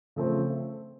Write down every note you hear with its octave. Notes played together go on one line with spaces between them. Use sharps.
C#3 F3 A3 C4